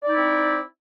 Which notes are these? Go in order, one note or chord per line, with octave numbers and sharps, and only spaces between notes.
C4 D#4 E4 D5